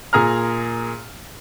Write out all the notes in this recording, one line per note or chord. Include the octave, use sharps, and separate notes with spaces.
A#2 G#4 A#5 F6